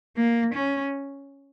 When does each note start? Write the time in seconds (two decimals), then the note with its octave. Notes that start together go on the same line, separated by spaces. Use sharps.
0.17 A#3
0.54 C#4